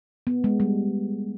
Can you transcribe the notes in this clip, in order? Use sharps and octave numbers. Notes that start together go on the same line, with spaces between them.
B3
G#3
G3